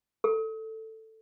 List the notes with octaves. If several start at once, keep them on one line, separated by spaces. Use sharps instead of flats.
A4